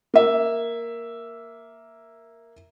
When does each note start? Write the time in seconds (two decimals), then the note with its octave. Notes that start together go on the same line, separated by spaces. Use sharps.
0.14 A#3 E5